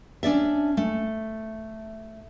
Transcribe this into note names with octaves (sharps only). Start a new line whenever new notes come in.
C#4 D4 D5 E5
A3